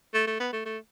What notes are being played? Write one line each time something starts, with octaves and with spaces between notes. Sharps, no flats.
A3
A3
B3
A3
A3